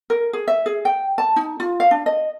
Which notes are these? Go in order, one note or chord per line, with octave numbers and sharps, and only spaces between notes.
A#4
G#4
E5
G#4
G5
A5
D#4
F4
F5
D4
D#5